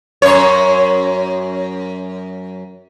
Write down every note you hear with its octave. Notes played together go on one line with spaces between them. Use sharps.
F#2 C#5